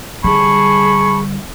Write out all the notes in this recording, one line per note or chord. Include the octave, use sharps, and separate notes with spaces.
D3 G3 G#4 A5 B5 C#6